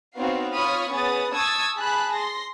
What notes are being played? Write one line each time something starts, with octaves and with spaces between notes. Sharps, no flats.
B3 C4 D#4 F#4 C#5 F5
F4 C#5 B5 C#6 D#6 F6
B3 C#4 G#4 D#6 A6
A5 C#6 D#6 E6 G#6 A6
G#4 A5 B5 F#6
C6 A#6